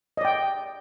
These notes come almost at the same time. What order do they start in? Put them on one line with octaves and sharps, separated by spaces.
D#5 D5 G5